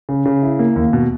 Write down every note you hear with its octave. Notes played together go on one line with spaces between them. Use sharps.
C#3
C#3
E4
A#3
D#2
B2